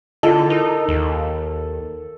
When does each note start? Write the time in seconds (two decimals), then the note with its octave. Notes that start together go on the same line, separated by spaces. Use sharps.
0.23 D3 E4 F4 A4 D#5
0.50 D#4 A#4
0.88 D#2